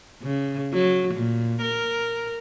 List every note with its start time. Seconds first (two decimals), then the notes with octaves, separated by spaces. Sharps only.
0.22 C#3
0.73 F#3
1.13 A#2
1.62 A#4